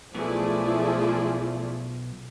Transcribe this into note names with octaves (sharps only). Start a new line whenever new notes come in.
B1 B2 F3 A3 E4 G#4 D5